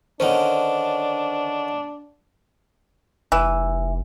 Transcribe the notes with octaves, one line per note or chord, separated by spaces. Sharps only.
D3 D#3 C#4 D4 C5
F1 E3